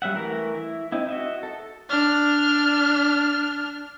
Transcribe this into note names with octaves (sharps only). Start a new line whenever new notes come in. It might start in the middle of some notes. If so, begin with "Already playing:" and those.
F#3 G3 C#4 E5 F#5
E3 A3 A#4
E4
C4 D#4 E4
F#4 D#5 E5
A4
D4 F6